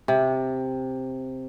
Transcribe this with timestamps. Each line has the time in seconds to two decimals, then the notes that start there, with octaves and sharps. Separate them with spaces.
0.08 C3